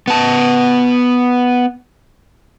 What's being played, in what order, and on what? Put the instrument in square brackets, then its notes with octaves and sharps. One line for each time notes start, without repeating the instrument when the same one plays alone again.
[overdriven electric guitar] B3 A5